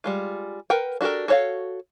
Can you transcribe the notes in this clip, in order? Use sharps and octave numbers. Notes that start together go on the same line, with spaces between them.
G3 G#3 F4
A#4 B4 F#5 G5
D4 F#4 G4 A4 A#4
F#4 A4 C#5 D#5 F5